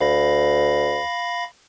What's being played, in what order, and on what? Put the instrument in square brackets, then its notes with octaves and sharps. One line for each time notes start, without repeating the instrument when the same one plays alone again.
[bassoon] D2 [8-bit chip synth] F5 B5 A#6